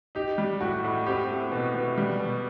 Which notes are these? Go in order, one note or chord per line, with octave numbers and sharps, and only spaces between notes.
D#4 G4
G3
A2 F#4
A2
C4 G4
A3
B2
B2
G3
B2